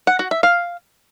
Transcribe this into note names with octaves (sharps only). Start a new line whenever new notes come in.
F#5
F#4
E5
F5